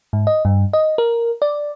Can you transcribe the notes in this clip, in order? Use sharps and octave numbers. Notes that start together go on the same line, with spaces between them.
G#2
D#5
G2
D#5
A#4
D5